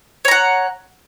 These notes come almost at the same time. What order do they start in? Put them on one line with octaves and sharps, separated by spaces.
C#5 A#5 F#5